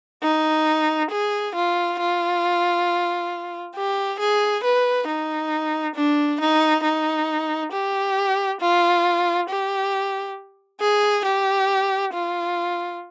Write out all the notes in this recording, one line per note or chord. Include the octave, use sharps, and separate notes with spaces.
D#4
G#4
F4
F4
G4
G#4
B4
D#4
D4
D#4
D#4
G4
F4
G4
G#4
G4
F4